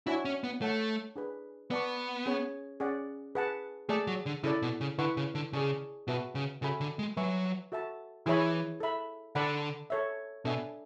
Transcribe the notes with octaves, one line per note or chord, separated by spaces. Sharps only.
D4 E4 F#4 C#5 E5 G#5
C#4
B3
A3 A4 C#5 F#5 A5
D4 G#4 B4
B3 B4 D5 A5 C#6
C#4 G#4 C#5
C#4 G#4 D5 F#5
G#4 B4 F#5 A5
A3 G#4 D5 A5
F#3
D3
C#3 E4 A4 D5
B2
C#3
D3 E4 B4 F#5 C#6
C#3
D3
C#3 G#4 D5 A5 C#6
B2 F#4 B4 E5 A5
C#3
C#3 F#4 A4 E5 G#5 B5
D3
G#3
F#3 B4 E5 G#5 C#6
F#4 A4 E5 A5
E3 E4 G#4 C#5 E5 B5
A4 E5 B5
D3 A4 D5 F#5 B5
A4 C#5 E5
B2 D4 A4 E5 G#5